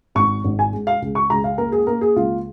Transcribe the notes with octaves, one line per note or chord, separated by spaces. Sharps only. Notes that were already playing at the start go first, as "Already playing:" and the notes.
G#1 C#6
G#1
G#5
G#3
F5
C#2
C#6
C#2 A#5
F5
A#3 A#4
G#4
A#3 A#4
G#4
C#2 F4